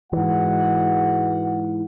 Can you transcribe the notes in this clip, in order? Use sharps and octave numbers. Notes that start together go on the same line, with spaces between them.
G#2 E3 G#3 F#4 F#5